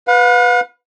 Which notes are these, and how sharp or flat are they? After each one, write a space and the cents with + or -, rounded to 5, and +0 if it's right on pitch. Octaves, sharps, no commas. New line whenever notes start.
B4 +0 F5 +45